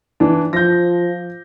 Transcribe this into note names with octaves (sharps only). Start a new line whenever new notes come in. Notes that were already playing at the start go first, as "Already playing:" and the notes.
E3 D4
F3 G6 A#6